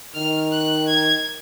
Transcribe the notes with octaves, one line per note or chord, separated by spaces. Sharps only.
D#3 F6
F#6
G#6